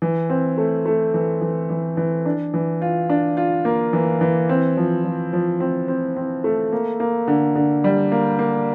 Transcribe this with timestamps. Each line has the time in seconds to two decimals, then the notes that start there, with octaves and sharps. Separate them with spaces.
0.02 E3
0.29 C4
0.58 A3
0.86 A3
1.14 E3
1.41 E3
1.70 E3
1.97 E3
2.26 D4
2.54 E3
2.82 F4
3.10 D4
3.37 F4
3.65 A#3
3.93 E3
4.21 E3
4.49 C4
4.77 F3
5.04 F3
5.33 F3
5.60 C4
5.88 C4
6.16 C4
6.44 A3
6.72 A#3
7.00 A#3
7.28 D3
7.55 D3
7.84 G3
8.12 A#3
8.39 A#3